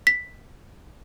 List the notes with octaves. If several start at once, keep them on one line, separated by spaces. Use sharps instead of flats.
B6